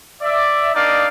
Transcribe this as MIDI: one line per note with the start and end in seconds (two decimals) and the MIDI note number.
0.21 0.72 74
0.21 0.72 76
0.74 1.07 58
0.74 1.07 62
0.74 1.07 63
0.74 1.07 74
0.74 1.07 75
0.74 1.07 77